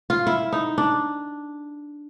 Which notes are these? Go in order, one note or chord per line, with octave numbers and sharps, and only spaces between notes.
F4
E4
D#4
D4